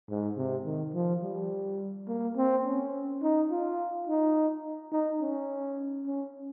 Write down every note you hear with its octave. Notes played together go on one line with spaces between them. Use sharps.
G#2
C3
D#3
F3
G3
A#3
C4
C#4
D#4
F4
D#4
D#4
C#4
C#4